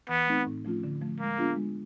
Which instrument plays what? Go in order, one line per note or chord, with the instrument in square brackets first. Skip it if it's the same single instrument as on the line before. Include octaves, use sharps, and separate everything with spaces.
[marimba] E3 [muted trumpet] B3
[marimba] A3 C4 D#4
A2
F3 A3 C#4 F4
D3
F3 A3
[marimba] G#3 [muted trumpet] A#3
[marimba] B3 D4 F4 G#4
G#3